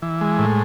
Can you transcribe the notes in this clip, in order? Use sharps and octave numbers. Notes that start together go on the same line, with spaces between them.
E3
G#3
A2